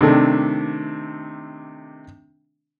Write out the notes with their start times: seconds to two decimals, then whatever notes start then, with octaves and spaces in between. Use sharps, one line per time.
0.01 C3 D#3 A3 D4